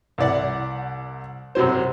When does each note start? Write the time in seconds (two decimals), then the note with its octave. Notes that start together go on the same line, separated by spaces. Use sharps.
0.18 C2 E4 D5 F#5
1.55 F#2 C3 F#3 C5